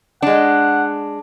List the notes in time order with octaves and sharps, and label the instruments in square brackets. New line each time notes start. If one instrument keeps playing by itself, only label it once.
[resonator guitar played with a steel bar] G#3 D4 [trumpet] F#5